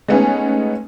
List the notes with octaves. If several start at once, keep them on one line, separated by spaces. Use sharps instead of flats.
G#3 A3 B3 C#4 D#4